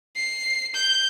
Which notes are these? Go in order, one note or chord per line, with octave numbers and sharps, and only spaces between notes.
C7
G6